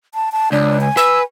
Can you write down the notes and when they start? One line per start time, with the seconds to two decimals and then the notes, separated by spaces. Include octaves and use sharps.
0.15 A5
0.32 A5
0.52 C#2 D4
0.81 G#5
0.97 B4 E6